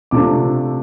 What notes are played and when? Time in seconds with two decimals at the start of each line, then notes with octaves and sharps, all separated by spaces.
0.11 C3 F3 A3 D4 D6